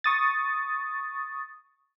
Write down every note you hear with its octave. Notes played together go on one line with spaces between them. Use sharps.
C#6 D#6 A6